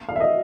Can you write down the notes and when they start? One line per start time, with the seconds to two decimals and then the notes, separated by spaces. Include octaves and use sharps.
0.09 F5
0.16 E5
0.20 D#5